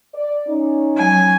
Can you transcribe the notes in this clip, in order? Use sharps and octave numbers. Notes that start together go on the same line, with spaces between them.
D5
C#4 D#4
F#3 G#5